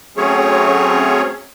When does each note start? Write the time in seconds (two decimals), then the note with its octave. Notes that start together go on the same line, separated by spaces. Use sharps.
0.17 F#3 A3 C4 C#4 G#4 C#5